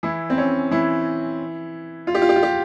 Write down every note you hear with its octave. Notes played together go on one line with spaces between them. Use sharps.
E3 E4
C4
C#4
E3 E4
F4
G4
F4
G4
F4
G4